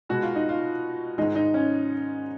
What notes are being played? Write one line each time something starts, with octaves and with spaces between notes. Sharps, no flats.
B2 G#3 F#4
F4
D#4
F4
G#2 D#3 G#3 D#4
D#4
C#4